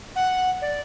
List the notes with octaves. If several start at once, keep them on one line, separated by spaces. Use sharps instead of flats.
F#5
D5